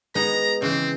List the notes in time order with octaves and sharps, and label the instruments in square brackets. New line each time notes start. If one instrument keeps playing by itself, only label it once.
[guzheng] G#3 B3 D#4 [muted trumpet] A#5
[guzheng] C#3 E3 [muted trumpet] C4